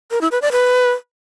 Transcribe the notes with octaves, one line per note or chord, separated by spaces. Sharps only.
A#4
E4
B4
D5
B4